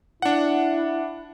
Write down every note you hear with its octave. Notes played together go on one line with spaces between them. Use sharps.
D4 E4 F#5